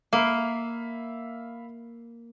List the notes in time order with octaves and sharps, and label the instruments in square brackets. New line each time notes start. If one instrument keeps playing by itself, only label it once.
[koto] A#3 [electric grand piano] E5 F5 B5